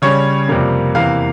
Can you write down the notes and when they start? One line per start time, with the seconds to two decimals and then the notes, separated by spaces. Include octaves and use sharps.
0.02 C#3 G3 C#4 C#5
0.49 F2 C3 G3 A#3
0.95 E2 C3 E3 A#3 F5